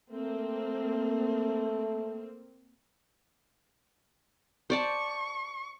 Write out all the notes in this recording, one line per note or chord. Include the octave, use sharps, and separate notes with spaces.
A3 A#3 C4
C5 D5 A5 C#6